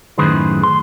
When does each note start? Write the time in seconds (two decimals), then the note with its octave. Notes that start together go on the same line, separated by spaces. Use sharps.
0.18 F#2 A2 D#3 G#4 B4 C5
0.63 C6